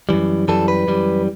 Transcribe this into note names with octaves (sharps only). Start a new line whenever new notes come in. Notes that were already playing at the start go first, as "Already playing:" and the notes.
F#2 E3 G3
F#2 E3 G3 A4
B4
F#2 E3 G3